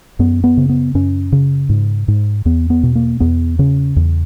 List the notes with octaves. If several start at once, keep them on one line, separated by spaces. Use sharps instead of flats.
F#2 B3
B3
C#3
B3
F#2 C#4
C#3
G#2
G#2
E2 B3
B3
B2
A#3
E2 B3
C#3 C#4
E2